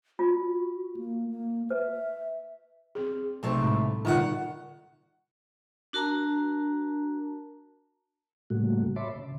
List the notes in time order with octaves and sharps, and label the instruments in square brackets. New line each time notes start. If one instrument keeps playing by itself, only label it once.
[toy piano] F4 [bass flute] F#4
[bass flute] A#3
A#3
[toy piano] B4 [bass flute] E5
[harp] C4 D5 [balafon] G#4
[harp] B1 C6 [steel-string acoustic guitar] C3 A3 C4
[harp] A2 B5 [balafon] G#3
[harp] B2 D3 G3 [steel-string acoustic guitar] D#3 E5 F#5 [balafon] D#4 F4
[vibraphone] D4 F#4 A#4 A5 A#5
[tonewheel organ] A2 C#3 G3 A3 A#3 F#4
C#5 E5 A5 B5 C6 D6
C#3